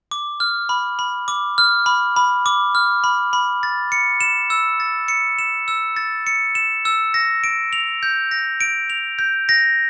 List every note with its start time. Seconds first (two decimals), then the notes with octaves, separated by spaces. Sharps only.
0.11 D6
0.40 F6
0.69 B5
0.99 B5
1.28 D6
1.58 F6
1.86 B5
2.16 B5
2.46 D6
2.75 F6
3.04 B5
3.33 B5
3.63 A6
3.92 C#7
4.21 E7
4.50 E6
4.80 A6
5.08 C#7
5.39 E7
5.68 E6
5.97 A6
6.27 C#7
6.55 E7
6.85 E6
7.14 A#6
7.44 D7
7.73 F7
8.03 G6
8.31 A#6
8.61 D7
8.90 F7
9.19 G6
9.49 A#6